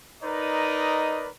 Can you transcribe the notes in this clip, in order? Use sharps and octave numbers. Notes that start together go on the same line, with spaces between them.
D#4 A#4 B4 D5 D#5